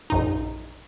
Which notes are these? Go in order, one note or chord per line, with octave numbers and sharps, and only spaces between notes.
A#1 F#2 D#4